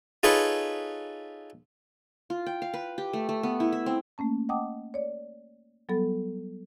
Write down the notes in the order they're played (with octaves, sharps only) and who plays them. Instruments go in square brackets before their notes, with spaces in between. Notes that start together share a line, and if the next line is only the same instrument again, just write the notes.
[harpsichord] D#4 F4 G#4 A4 B4 C#5
[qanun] F4
G5
F5
B4
G4
A3
A3
B3
E4
E5
C4
[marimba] A3 A#3 C#4 A5
D#5 F#5 G5 A5 D6 D#6
C#5 D5
F#3 G3 B3 A4 A6